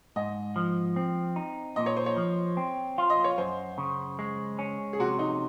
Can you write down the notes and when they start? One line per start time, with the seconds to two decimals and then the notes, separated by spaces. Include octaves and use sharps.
0.16 G#2 D#5
0.56 F3
0.96 C4
1.36 D#4
1.76 A#2 D#5
1.86 C#5
1.97 C5
2.06 C#5
2.17 F3
2.57 C4
2.98 F4
3.10 D#5
3.24 C#5
3.38 F#2 C5
3.78 C#3
4.19 G#3
4.59 C#4
4.93 G#4
5.00 C3 F#4
5.19 D#4